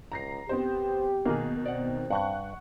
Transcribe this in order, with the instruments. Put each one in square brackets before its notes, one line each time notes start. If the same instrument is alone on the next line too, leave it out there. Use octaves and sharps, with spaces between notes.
[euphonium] C#2 [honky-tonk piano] A#5 A#6 C7
[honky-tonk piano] B3 C4 C5 [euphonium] G4
[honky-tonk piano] B2 D#3 D#4 [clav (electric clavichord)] A#3 G#4
[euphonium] C4 [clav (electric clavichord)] D5 F#5
[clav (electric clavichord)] G2 [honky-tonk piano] F#5 C#6 F#6